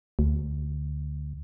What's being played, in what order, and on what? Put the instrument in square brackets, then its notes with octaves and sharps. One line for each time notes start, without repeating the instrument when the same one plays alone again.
[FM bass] D2